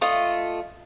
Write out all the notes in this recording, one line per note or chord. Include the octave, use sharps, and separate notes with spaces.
A3 F4 D#5